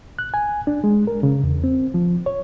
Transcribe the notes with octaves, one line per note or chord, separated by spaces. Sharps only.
F#6
G#5
D4
G#3
A#4
C#3
E2
C4
F3
C#5